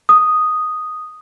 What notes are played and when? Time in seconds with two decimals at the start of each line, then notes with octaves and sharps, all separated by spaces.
0.09 D#6